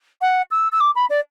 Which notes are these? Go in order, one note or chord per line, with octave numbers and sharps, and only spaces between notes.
F#5
E6
E6
D6
B5
D5